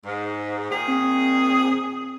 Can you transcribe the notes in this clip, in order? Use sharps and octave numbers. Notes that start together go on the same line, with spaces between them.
G#2
A#2 D#3 G#4
C4